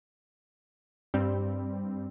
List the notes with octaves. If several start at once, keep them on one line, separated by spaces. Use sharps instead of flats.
G2 G3 C4